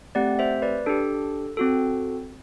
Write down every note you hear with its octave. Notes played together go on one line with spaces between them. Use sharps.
A3 C4 G4 D5 F#5
C5 E5
B4 D5
D4 G4 A4
C4 F#4 A4